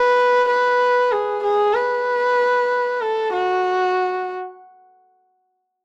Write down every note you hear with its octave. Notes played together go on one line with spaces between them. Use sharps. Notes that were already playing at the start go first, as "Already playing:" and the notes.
Already playing: B4
B4
G#4
G#4
B4
A4
F#4